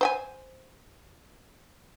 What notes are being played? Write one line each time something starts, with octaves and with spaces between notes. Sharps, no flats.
C5 G5 G#5